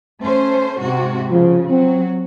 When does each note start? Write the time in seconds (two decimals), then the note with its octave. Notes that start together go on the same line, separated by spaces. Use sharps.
0.23 A3 C#4 C5
0.82 G#2 C3 F#4
1.31 C#3 F3
1.69 F#3 C4 F#4